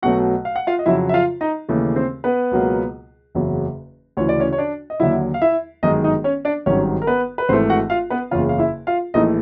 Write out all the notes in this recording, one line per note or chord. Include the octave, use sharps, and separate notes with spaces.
B1 B2 F#3 A3 F#4 F#5
F5
F#5
F4 F5
D#5
F2 C#3 F#3 E4 E5
E5
F4 F5
D#4 D#5
D#2 C#3 E3 A3
C4 C5
B3 B4
C#2 B2 F#3 A#3
F#1 E2 C#3 F#3
D2 C#3 E3 C#5
D5
C#4 C#5
C#5
D4 D5
D#5
D#2 D3 F#3 E4 E5
F5
E4 E5
G1 F#2 D#3 G#3 D#4 D#5
D#4 D#5
C#4 C#5
D4 D5
G#1 G2 D#3 F#3 C#4 C#5
A#4
B3 B4
B4
G#1 G#2 E3 A3 C4 C5
F#4 F#5
F4 F5
B3 B4
F#1 E2 C#3 F4 F5
F5
E4 E5
F4 F5
A#1 A2 E3 A3 D#4 D#5